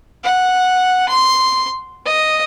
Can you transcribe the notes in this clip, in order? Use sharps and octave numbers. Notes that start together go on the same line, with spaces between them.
F#5
C6
D#5